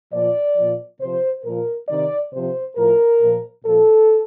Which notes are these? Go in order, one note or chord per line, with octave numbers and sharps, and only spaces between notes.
A#2 F3 D5
A#2 F3
C3 F3 C5
A#2 F3 A#4
C3 D#3 D5
C3 F3 C5
A2 F3 A#4
A#2 F3
A#2 F3 A4